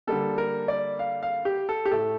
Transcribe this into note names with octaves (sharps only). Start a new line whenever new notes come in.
D3 G3 A#3 A4
A#4
D5
F5
F5
G4
A4
G4
A2 A3 A4